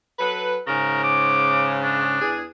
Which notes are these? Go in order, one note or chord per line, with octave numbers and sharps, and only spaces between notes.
F#3 A4 B4
G#2 C#3 A#4
D6
D4
E2 G#4